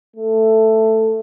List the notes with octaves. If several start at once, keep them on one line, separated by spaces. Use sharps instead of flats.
A3